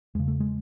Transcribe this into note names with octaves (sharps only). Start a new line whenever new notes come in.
E2 C#3 G#3
A3
G#3